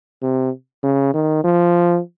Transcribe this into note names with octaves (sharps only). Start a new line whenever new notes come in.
C3
C#3
D#3
F3